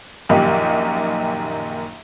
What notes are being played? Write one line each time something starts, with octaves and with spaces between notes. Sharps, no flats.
A#1 F#2 D#3 A#3 D#4 G4